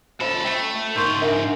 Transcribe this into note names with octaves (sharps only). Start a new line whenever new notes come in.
C#2 F4 A4 C5 F5
A3 G5
G#2 D#4 F4 A#4 C6 C#6 G6
D4 A#4 E5 F#5